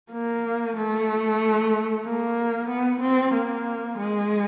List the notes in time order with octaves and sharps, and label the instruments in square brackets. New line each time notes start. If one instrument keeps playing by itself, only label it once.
[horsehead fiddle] A#3
A3
A#3
B3
C4
A#3
G#3